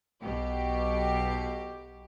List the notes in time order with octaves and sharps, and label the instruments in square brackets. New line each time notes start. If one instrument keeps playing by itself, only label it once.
[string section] B1 B2 G4